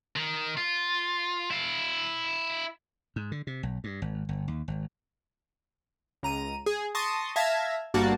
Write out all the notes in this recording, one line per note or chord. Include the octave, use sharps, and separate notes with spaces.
D#3
F4
E4 F5
G#2
D3
C3
B1
G2
G#1
G1
D#2
G#1
C#2 A#5 D#7
G#4
A5 C6 C#6 D#6 A#6
E5 F5 A5 G#6 A#6
G1 G2 A#3 F#4 A5